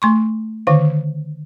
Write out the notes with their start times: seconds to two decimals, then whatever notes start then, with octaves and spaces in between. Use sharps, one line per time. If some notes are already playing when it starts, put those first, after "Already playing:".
0.02 A3 C6 C#6
0.67 D3 D#3 F5